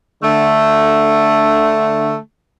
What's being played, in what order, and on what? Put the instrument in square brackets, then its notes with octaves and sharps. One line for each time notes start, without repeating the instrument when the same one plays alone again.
[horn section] D3 A3